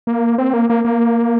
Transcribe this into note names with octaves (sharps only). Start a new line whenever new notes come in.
A#3
C4
A#3
A#3
A#3